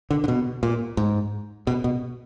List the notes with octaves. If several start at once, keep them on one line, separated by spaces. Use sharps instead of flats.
D3
D3
B2
A#2
G#2
B2
B2